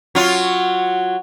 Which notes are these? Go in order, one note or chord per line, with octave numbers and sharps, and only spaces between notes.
F#3 F4